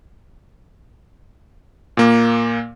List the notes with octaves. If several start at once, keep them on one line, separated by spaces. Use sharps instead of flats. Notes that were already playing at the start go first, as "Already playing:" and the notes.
A#2 A#3